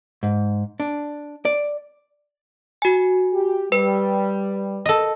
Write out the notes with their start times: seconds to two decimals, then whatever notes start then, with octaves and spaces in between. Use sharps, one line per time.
0.23 G#2
0.80 D4
1.45 D5
2.82 F#4 G#5
3.33 G4
3.72 G3 B4
4.86 A4 D#5